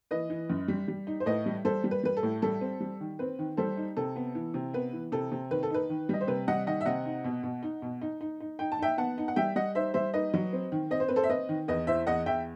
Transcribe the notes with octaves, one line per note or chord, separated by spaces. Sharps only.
E3 B4 D#5
E3
F#2
G3
G3
D#4
C5
A2 B4 D#5
G3
G3 A4 C5
G3
B4
G3 B4
A4
A2
G3 A4
C4
G3
D#3
C4 B4
D#3
G3 A4 C5
D#4
C3 A4
B3
E3
C3
B3 B4
E3
C3 A4
C3
D#3 B4
A4
D#4 B4
D#3
G3 D#5
C5
C3 B4
G3 D#5 F#5
D#3 D#5 F#5
E5
C3 D#5 F#5
D#4
B2
B2
D#4
B2
D#4
D#4
D#4
D#4 G5
A5
D#4 E5 G5
B3 F#5 A5
D#4
F#5
G3 E5 G5
G3 D#5 F#5
D#4 C5 E5
G3 C5 E5
D#4 B4 D#5
F#3
C4
D#3
C4 D#5
C5
C4 B4
A4 C5
E5
C4 B4 D#5
D#3
E2 B4 D#5
E4 C5 E5
E2 D#5 F#5
E2 E5 G5